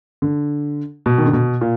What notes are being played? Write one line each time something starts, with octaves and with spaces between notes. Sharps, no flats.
D3
B2
D#3
D3
B2
A#2